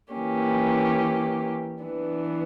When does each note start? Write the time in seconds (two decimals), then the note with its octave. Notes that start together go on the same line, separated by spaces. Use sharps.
0.13 E3 A#3 C#4 G4
1.83 E3 B3 D4